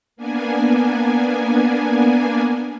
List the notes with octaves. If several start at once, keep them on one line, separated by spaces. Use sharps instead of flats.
A#3 B3 D4 G#5